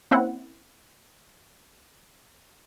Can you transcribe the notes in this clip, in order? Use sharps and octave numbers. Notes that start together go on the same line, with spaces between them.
A#3 C4 C#4 E4 F#5